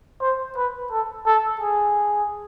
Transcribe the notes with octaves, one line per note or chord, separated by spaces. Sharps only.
C5
B4
A4
A4
G#4